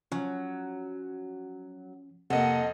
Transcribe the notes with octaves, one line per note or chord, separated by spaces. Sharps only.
F3 F#3 C#4
F2 C3 A#3 A4 D#5 F#5